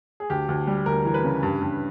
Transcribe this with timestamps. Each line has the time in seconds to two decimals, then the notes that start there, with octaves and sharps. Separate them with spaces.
0.20 G#4
0.30 D2 G4
0.48 D2
0.67 G3
0.86 D2 A#4
1.05 E3 A#4
1.14 B4
1.24 C#3
1.43 G2
1.62 G2